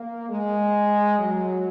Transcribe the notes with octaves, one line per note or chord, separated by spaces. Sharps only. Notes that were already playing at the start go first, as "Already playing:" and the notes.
Already playing: A#3
G#3
F#3